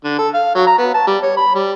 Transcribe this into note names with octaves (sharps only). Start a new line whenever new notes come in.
D3
A4
F5
F#3
A#5
B3
A5
G3
C#5
B5
G3